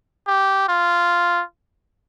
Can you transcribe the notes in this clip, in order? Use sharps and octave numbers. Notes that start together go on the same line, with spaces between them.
G4
F4